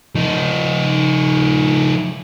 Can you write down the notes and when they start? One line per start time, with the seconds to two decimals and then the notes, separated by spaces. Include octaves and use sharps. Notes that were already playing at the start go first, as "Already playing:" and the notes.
0.15 F3 D#4